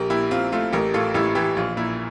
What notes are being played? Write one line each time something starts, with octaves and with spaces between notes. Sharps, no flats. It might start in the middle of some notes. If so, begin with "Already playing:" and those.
Already playing: A#1 G4 A#4
A#2 E4 G4
C4 F4
A3 F4
A1 G4 A#4
A2 F4 A4
A1 E4 G4
E3 E4 G4
A#1 F4
A#2 E4